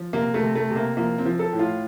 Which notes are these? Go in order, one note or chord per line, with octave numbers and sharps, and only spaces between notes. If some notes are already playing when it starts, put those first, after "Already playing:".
Already playing: F3
C3 A#3
A3
C3
A3
C3
A#3
F3 A#3
C4
F3
A4
A2
F4